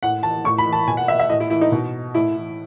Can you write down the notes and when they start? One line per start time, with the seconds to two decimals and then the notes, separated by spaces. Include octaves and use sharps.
0.03 A2 F#5
0.23 E3 A5
0.44 A2 C#6
0.58 B5
0.66 E3
0.73 A5
0.88 B2 G#5
0.97 F#5
1.08 E5
1.19 E5
1.29 A2 D#5
1.40 E4
1.50 E3 E4
1.61 D#4
1.72 B2
2.14 A2 E4
2.36 E3